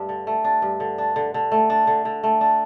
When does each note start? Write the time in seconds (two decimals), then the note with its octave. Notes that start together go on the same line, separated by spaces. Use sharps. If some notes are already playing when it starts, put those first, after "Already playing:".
Already playing: G2 A3 D4
0.09 D3
0.27 A3
0.44 D4
0.62 G2
0.80 D3
0.98 D4
1.16 D3
1.34 D3
1.52 A3
1.70 D4
1.87 D3
2.05 D3
2.23 A3
2.41 D4